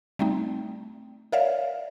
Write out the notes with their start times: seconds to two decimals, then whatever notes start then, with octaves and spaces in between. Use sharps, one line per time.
0.19 G3 A3 C4 D#4
1.32 A#4 C#5 D5 E5 F5